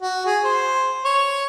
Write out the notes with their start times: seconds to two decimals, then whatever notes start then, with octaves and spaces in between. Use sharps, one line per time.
0.02 F#4
0.26 G#4
0.44 C5
1.04 C#5